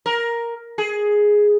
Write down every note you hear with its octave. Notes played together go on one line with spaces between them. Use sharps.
A#4
G#4